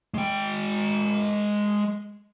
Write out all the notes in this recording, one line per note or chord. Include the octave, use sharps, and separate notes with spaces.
G#3 G5